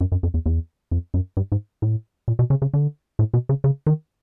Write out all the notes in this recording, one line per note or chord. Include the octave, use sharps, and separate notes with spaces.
F#2
F#2
F2
E2
E2
F2
F#2
G2
G#2
A2
A#2
B2
C#3
C#3
D3
A2
B2
C#3
C#3
D#3